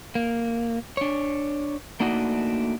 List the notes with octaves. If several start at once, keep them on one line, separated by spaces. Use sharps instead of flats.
A#3
D4 C#5
A3 A#3 D4 D#4 F#4